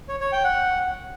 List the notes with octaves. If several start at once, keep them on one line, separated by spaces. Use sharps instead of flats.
C#5
C#5
G5
F#5